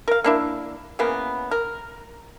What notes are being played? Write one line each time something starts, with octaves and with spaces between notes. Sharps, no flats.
A#4 F5
A#3 D4 E4
C#3 E3 A#3 B3
A#4